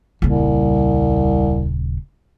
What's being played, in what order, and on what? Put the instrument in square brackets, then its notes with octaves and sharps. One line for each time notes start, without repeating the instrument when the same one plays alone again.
[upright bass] D#1 C#3 [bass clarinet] C2